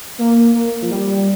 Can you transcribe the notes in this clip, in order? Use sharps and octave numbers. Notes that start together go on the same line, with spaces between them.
A#3
A#3
F3
G3